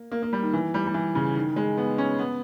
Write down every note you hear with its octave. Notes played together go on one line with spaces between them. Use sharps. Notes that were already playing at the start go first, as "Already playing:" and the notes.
Already playing: A#3
A#3
A#3
G3
D#3
E3
G3
G3
E3
C#3
D#3
G#3
B3
C#4
B3